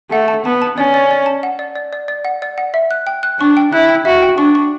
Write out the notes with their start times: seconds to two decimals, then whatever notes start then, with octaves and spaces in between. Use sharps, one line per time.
0.11 A3 F#5
0.28 A5
0.44 B3 A5
0.62 A5
0.77 C#4 D5
0.94 D5
1.11 D5
1.26 A5
1.43 F#5
1.59 D5
1.76 D5
1.93 D5
2.08 D5
2.25 F#5
2.42 D5
2.58 F#5
2.74 E5
2.91 F#6
3.07 G5
3.23 F#6
3.39 D4 C#6
3.57 G5
3.72 E4 F#6
3.89 G5
4.05 F#4 E5
4.22 G5
4.38 D4 C#6
4.55 C#6